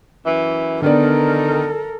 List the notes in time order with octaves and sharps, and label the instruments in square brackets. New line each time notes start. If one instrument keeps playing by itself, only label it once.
[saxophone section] F#2 E3
[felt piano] D3 B3 D5 [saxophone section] D#3 [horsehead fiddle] A4 A#4